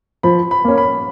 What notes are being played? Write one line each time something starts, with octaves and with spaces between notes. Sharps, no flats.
F3 B5
B5
A#3 C#4
B5